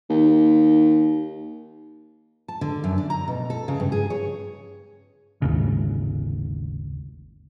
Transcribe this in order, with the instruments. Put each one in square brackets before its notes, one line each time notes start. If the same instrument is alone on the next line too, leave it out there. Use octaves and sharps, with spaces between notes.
[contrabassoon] D#2
[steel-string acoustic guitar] A5
D3
F#2
D4
A#5
B2
A4
C#3
G2
G#4
C#5
[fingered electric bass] G#1 D#2 C#3